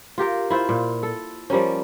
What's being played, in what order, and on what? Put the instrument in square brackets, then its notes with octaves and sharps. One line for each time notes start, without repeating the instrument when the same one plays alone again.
[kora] F4 G4 A#4 F5
E4 F4 C5
A#2
A4
F3 G3 A#3 C#4